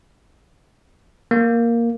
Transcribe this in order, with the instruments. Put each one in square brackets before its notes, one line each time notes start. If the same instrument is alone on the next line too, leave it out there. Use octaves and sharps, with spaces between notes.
[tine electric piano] A#3